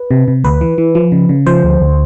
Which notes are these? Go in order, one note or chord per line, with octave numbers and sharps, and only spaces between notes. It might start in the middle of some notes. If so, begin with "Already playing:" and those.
Already playing: B4
C3
C3
D2 B4
E3
E3
F3
C#3
C#3
F3 C5
D2
D2